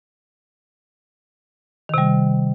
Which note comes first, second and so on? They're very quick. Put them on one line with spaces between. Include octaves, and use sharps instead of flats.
D#3 C3 G3